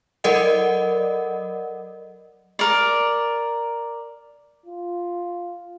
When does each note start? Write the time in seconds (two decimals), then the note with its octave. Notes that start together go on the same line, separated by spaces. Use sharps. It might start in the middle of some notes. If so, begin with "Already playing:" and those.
0.24 F#3 A4 A#4 D5 D#5 F#5
2.59 A#4 D5
4.66 F4